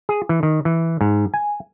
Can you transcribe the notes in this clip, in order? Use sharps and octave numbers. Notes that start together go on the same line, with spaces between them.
G#4
E3
D#3
E3
G#2
G#5